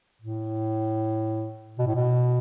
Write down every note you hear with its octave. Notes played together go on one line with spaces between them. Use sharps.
A2
B2
A2
B2